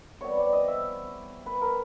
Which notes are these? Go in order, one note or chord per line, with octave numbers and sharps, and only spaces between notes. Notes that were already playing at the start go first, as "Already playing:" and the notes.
C3 E3 G3 B3 C#5
D5
D#5
E5
B4
A#4